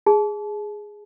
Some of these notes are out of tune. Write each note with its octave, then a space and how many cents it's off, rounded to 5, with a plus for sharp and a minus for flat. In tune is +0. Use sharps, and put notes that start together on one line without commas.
G#4 +0 A5 -35